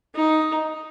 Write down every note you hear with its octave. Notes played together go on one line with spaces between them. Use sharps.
D#4